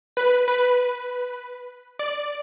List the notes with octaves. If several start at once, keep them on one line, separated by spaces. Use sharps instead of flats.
B4
B4
D5